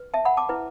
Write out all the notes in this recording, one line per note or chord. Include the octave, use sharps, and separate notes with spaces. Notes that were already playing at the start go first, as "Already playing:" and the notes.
Already playing: B4
E5 A5
F#5 B5
A5 D6
E4 B4